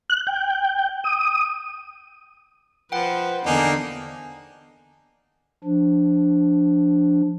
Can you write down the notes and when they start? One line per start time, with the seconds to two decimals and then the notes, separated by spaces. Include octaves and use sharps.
0.10 F#6
0.27 G5
1.04 D#6
2.92 F3 B4 C5 F#5 G5
3.46 E2 D3 A#3 D4 D#4 G#5 A5
5.64 F3 D4